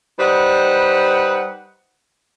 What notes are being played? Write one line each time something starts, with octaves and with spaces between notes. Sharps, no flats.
G3 D#4 B4 C5 F#5